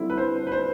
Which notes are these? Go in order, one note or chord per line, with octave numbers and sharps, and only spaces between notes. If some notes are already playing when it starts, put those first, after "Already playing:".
Already playing: D3 G3 C4 E4
B4
C5
B4
C5